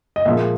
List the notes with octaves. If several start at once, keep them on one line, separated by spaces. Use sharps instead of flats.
D#5
A#2 F3 G#3 E5